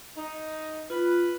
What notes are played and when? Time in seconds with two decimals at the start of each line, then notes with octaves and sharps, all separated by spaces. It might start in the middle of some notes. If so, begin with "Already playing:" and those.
0.17 D#4
0.90 F4 B4